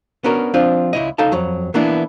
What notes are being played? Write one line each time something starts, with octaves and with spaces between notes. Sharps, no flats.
B3 C#4 D4 F#4 A#4
F3 C4 D4 F4
C#2 E4 D#5
C#2 D#4 A4 F5 A5
F2 F#3
E3 A#3 B3 D4 E4